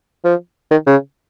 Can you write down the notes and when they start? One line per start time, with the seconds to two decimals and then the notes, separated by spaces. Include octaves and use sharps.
0.25 F3
0.71 D#3
0.86 C#3